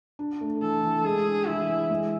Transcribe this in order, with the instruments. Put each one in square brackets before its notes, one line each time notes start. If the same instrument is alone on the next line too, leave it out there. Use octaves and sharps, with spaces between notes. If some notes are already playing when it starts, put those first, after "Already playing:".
[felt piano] D4
A3
[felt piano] E3 [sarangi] A4
[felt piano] E3
[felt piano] G#3 [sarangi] G#4
[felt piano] D4
[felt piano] E3 [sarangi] E4
[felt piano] E3
G#3